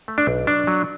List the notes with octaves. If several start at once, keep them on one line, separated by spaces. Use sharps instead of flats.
A3
D4
B1
F#3 D4
F#3